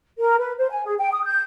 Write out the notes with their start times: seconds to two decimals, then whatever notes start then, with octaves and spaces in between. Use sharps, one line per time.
0.19 A#4
0.39 B4
0.58 C5
0.70 G#5
0.84 G#4
0.98 G5
1.12 D#6
1.25 G6